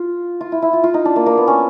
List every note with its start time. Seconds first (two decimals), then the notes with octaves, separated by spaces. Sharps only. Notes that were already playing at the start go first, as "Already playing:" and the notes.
Already playing: F4
0.41 F4
0.52 E4
0.62 E4
0.73 F4
0.84 F4
0.94 D#4
1.05 D4
1.16 A#3
1.26 A#3
1.37 B3
1.47 C#4